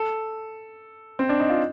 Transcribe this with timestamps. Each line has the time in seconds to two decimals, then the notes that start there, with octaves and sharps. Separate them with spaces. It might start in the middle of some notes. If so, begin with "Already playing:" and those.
Already playing: A4
1.19 C4
1.29 D4
1.40 D#4
1.50 F4